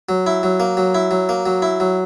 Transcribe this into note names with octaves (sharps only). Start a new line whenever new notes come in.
F#3
E4
F#3
A#3
F#3
E4
F#3
A#3
F#3
E4
F#3